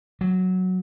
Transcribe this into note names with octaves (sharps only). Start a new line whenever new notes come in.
F#3